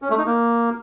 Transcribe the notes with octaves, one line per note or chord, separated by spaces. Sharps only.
C#4
A3
D#4
A#3